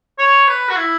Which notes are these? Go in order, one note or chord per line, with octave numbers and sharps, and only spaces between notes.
C#5
B4
F#4
E4